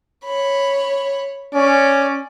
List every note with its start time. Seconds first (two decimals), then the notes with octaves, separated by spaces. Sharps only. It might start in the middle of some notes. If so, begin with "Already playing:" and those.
0.24 C#5 B5
1.54 C#4 D5